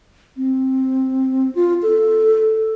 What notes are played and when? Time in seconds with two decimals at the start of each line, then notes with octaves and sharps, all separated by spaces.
0.37 C4
1.55 F4
1.82 A4